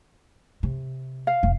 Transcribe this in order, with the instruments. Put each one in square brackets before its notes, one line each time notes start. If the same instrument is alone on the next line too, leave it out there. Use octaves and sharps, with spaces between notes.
[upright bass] C3
[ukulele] F5
[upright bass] F1